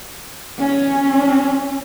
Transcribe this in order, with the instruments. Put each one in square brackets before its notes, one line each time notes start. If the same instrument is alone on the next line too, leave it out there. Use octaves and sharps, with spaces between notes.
[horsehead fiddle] C#4